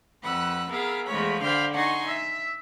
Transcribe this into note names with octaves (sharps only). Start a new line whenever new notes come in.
F2 B4 F#5 E6 F#6
B3 G#4 A#4 E5 F5
E2 F3 G#3 A3 C#5 B5
D3 C5 F5 G5 B5 F6
D#4 F#5 G#5 C6 C#6
E5 E6